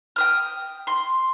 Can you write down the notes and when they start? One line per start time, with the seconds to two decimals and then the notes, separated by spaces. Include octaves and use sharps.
0.16 G5 D#6 F6
0.87 C6